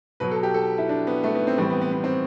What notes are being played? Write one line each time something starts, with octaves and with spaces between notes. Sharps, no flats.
B2 F#3 B4
A4
G4
A4
E4
D4
B3
A3
B3
C4
A2 E3 G3 C4
B3
B3
B3
C4